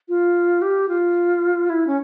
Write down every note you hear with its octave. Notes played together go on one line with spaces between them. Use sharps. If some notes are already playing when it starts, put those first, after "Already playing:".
F4
G4
F4
E4
C#4